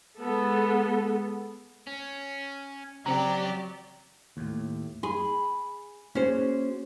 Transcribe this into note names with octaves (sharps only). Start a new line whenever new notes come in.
G#3 B3 A4
C#4
C#3 F#3 C4 F#4 G4 D5 A#5
D#2 A2
G#4 B5
A#3 B3 C#4 F#4 G#4 C5